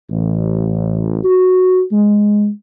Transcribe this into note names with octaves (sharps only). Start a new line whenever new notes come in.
A1
F#4
G#3